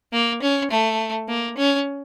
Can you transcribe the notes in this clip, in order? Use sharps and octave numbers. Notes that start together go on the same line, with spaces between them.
A#3
C#4
A3
A#3
C#4